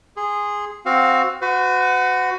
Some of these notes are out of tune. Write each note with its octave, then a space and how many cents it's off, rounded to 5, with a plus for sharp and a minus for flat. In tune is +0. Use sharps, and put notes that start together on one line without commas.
G#4 -10 C6 +0
C4 +0 F#4 +0 F5 +15
F#4 -5 B4 +45